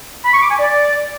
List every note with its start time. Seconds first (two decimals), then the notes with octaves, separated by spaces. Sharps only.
0.25 B5
0.33 C#6
0.42 D6
0.50 G#5
0.59 D5